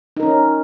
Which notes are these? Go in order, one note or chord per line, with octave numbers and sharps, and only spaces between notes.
C#4 D#4 A#4